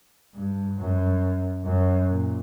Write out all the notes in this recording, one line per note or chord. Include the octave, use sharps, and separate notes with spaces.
G2
F#2
F#2
A#2